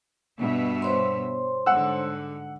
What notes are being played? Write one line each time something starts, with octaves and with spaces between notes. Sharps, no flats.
G2 B2 E5
C5 C#5 C6
G#2 D3 F#5 E6